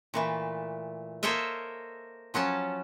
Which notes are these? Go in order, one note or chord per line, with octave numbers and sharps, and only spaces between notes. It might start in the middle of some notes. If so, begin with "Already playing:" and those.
A#2 E3 A3
A#3 A4 C5 C#5 D#5 E5
F3 F#3 C#4 A5